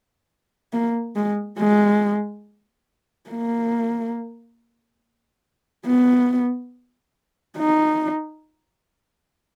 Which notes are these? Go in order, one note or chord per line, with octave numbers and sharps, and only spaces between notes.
A#3
G#3
G#3
A#3
B3
D#4